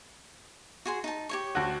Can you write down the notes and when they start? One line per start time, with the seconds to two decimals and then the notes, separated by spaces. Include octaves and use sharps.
0.86 F#4 G#4 C6
1.04 D#4 A5
1.29 G4 C#5 C#6
1.55 D2 F#4